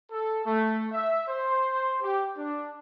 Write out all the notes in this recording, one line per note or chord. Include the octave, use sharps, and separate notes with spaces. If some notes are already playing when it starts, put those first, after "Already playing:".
A4
A3
E5
C5
G4
D4